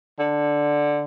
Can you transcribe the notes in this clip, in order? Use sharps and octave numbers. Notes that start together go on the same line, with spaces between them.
D3